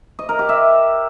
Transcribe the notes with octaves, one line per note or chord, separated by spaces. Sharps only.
D#5
A#4
G4
E5